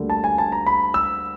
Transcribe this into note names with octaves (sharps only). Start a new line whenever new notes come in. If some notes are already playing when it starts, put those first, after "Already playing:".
Already playing: D2 D3 G3 A#3
A5
G#5
A5
A#5
B5
E6